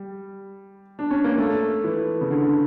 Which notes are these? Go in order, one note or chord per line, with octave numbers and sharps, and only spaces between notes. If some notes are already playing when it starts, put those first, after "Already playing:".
Already playing: G3
D4
C#4
A#3
A3
E3
C#3
D3